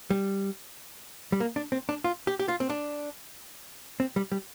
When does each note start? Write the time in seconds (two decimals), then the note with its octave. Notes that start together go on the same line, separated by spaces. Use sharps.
0.10 G3
1.32 G3
1.40 A#3
1.56 D4
1.72 C4
1.89 D4
2.04 F4
2.27 G4
2.40 G4
2.48 F4
2.60 C4
2.70 D4
4.00 C4
4.16 G3
4.32 G3